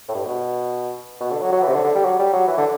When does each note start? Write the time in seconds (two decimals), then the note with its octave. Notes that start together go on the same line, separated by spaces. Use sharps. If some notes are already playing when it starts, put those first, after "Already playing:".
0.09 A2
0.15 G2
0.25 B2
1.21 B2
1.31 D3
1.41 F#3
1.52 F#3
1.63 E3
1.68 C3
1.74 D3
1.84 D3
1.95 G3
2.05 F#3
2.19 G3
2.33 F#3
2.47 E3
2.58 D3